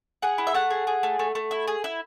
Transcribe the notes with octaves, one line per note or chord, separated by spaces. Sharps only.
G#4 F#5
E4
E5
A3 F#5
G#4
G#4
A3
A3
A3
E4
G#4
E4